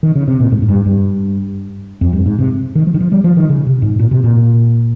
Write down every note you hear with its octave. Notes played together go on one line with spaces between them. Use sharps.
D#3
C#3
C3
A#2
G#2
G#2
G2
G2
F2
G2
G#2
C3
D#3
F3
D#3
F3
G3
F3
D#3
C#3
C3
G#2
A#2
C3
A#2